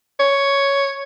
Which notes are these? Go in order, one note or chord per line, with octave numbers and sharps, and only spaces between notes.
C#5